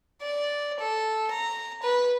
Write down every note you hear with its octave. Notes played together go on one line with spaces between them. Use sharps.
D5
A4
A#5
B4